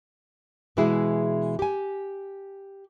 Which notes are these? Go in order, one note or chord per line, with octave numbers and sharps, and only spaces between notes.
B2 E3 G#3 E4 F#4 G#4
G4 G#5